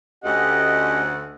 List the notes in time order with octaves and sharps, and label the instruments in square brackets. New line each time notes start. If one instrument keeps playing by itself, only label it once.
[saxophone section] D2 [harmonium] C#4 G4 D#5 [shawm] F#5